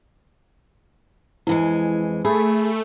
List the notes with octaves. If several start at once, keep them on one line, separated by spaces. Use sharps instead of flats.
F2 E3 G#3 E4
A3 G#4 B5